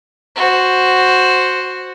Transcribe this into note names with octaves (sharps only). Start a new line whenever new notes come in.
F#4 C5